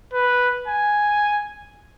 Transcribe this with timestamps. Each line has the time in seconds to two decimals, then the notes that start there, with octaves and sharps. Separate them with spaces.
0.13 B4
0.68 G#5